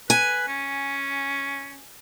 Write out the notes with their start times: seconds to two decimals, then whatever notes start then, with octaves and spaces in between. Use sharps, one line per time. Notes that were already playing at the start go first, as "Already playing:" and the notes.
0.10 B4 G#5
0.49 C#4